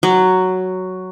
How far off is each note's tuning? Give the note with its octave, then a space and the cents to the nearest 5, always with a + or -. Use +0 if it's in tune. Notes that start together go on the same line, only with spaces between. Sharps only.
F#3 +5